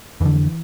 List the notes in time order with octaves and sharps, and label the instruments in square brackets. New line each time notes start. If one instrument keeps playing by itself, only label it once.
[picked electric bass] F2 D3 E3